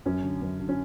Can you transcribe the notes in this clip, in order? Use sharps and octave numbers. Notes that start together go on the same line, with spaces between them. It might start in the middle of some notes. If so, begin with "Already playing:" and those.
F#2 C#4
D3
F#2
D3
C#4